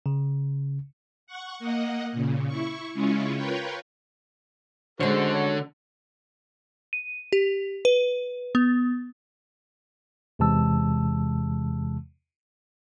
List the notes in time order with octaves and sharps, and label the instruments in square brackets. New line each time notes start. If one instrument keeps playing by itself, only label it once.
[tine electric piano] C#3
[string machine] F#5 C#6
A#3 D#5 F#5
A#2 C#3
E4 C#6
C#3 G#3 C#4 E4 F4 C#5
F4 A#4 B4 C#5 G5
[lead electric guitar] D3 [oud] G#3 C#4 [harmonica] F#4 A4 [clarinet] C5
[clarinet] C#5
[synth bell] D#7
G4
B4
B3
[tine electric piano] E2 C3 E3 G#3 A5 E6